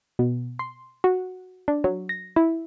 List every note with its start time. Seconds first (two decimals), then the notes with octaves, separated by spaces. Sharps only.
0.19 B2
0.59 C6
1.04 F#4
1.68 D4
1.84 F#3
2.09 A#6
2.36 E4